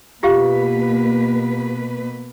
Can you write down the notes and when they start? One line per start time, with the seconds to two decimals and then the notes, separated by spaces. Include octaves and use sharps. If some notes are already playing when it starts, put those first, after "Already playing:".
0.23 B2 A#3 F4 G4 B4 F5